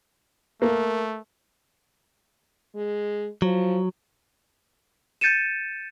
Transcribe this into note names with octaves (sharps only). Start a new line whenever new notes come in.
A3 A#3
G#3
F3 F#3
G6 A6 C#7 D#7 E7